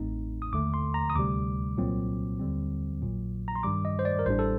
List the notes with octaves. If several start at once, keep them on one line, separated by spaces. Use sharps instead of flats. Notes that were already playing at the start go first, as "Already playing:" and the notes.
Already playing: A1 A2 A3 C4 D#4
D#6
D#2 D3 A3 D6
C6
A#5
D#6
D2 C3 G3 D6
C2 A#2 F#3 C4
D#2 D3 G3 C4
A#1 A#2 F#3
A#5
C6
G2 D#3 G3 D6
D#5
C5
D5
A#4
A1 A2 G3 D4 C5
A4